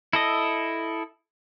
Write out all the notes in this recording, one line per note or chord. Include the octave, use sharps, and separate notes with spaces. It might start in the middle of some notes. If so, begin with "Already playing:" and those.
E4 A4 D#5